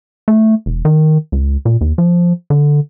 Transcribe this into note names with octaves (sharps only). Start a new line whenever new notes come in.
A3
E1
D#3
C#2
A#2
D#2
F3
D3